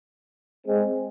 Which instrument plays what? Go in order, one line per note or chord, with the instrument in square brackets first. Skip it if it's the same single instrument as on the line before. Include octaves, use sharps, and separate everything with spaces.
[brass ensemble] G#3 C4